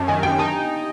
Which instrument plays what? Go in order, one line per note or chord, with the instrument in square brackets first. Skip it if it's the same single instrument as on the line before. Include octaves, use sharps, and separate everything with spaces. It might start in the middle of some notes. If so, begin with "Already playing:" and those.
Already playing: [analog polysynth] F#2 [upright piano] A5
[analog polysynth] D#3 [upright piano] G#5
[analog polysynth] F#2 [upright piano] G5
[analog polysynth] D#4 [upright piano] A5